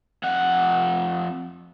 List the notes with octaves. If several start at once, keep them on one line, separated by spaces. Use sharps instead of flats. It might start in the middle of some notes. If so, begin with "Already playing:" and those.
F2 F#5